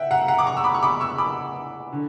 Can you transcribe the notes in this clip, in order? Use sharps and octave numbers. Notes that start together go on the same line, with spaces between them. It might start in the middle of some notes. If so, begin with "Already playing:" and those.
Already playing: E5 F#5 G5
F#5 A#5
F#5 A#5
D6
A#5 C#6
E6
B5 D6
C#6
B5 D6
C#6 E6
B5 D6
D3